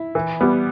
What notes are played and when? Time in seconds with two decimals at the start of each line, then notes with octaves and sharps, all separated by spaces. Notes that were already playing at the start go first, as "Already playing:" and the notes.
Already playing: E4
0.15 E3
0.41 G3 B3